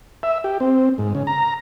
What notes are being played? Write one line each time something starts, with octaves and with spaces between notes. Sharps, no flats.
E5
G4
C4
G#2
C#3
A#5